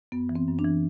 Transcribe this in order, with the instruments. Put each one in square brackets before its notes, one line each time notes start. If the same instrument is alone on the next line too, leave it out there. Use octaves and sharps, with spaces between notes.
[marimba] F#2 B3
E3
C4
F#2
D4
E3